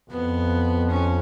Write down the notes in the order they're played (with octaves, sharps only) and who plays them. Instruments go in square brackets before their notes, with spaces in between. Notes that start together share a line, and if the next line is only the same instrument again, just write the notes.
[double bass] F2 [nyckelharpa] B3
[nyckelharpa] C#4